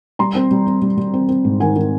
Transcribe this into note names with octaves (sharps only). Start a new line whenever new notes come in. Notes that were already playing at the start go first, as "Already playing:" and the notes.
G3 A#5 C6
C4
G3
C4
G3
G3
C4
C4
G#2
D#3 F#5 G#5
D#3